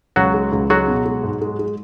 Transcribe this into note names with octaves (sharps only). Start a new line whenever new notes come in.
C#2 F#3 F#4
G#3
C#2
F#3 G#3 F#4
B2
G#3
G#2
G#3
G#3